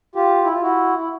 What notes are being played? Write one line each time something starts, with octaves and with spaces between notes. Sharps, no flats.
F4 G4
E4
F4
E4 F#4
E4